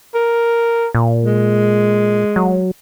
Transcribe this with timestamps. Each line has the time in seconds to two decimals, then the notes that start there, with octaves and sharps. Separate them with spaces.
0.14 A#4
0.95 A#2
1.25 G#3
2.36 F#3